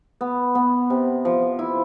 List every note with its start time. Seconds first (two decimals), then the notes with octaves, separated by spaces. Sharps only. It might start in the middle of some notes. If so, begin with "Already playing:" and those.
0.21 B3
0.55 B3
0.90 C3
1.25 F3
1.59 E4